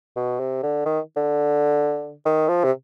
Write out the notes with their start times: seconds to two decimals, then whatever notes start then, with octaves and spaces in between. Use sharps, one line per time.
0.16 B2
0.39 C3
0.63 D3
0.85 D#3
1.16 D3
2.25 D#3
2.48 F3
2.64 C3